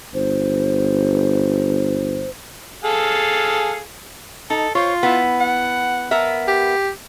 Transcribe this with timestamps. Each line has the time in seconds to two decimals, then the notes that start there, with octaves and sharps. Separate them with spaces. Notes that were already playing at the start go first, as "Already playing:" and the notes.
0.14 G1 C5
2.84 G#4 A4 F5
4.50 D#4 A4
4.75 F4 C5 C#5
5.03 B3 E4
5.40 F#5
6.11 B3 A#4 E5
6.48 G4